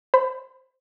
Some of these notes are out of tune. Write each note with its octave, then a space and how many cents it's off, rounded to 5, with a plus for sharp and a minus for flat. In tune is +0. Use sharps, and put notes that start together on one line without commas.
C5 +0 B5 +25